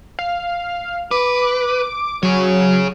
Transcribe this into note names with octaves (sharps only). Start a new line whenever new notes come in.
F5
B4 D6
F#3 G#4 C#5